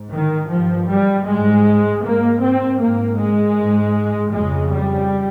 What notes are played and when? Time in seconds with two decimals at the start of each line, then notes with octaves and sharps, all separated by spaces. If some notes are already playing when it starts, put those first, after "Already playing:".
Already playing: G#2
0.12 D#3
0.49 G2 F3
0.88 G3
1.26 G#2 G#3
2.03 G#2 A#3
2.41 C4
2.80 G#2 A#3
3.18 G#3
3.57 G#2
4.33 F2 C#3 G#3
4.72 G3